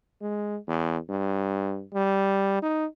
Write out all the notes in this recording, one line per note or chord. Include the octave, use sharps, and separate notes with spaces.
G#3
E2
G2
G3
D#4